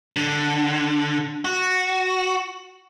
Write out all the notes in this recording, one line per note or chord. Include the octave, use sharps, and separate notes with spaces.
D3
F#4